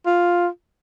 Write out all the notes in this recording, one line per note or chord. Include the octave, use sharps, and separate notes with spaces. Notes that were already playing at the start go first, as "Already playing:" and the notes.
F4